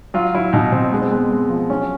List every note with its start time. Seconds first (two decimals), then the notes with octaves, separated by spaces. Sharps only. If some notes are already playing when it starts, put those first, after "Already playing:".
0.14 F#3 F4
0.34 F#3 E4
0.53 B2 D#4
0.72 B2 C4
0.93 G#3 B3
1.02 C4
1.11 G#3 B3
1.31 G#3 C4
1.50 F3
1.69 F#3 C#4